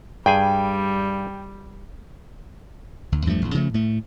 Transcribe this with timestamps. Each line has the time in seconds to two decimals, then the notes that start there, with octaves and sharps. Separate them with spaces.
0.26 G2 G3 G#4 G5 G#5
3.12 D2
3.26 E2 G2 F3 A3
3.42 A#1 E2
3.54 C#3 F3 A3
3.74 A2 A3